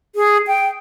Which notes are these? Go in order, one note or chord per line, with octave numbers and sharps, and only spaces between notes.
G#4
G5